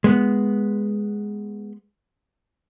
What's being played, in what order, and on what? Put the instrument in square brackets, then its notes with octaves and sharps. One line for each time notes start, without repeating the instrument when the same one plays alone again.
[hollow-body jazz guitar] G#3 B3